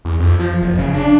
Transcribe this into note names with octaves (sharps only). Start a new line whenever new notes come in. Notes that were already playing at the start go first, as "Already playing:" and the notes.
E2
F2
F3
F#1
C#3
D4